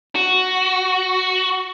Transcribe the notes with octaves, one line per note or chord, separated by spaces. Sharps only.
F#4